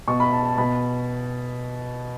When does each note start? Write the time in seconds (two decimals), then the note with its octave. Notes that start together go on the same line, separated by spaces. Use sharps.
0.08 B2 C#6
0.20 B5
0.33 A5
0.45 A5
0.57 B2 B5